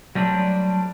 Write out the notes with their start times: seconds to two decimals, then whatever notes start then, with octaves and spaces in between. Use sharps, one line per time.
0.15 F#3 G3 A3 C4 D4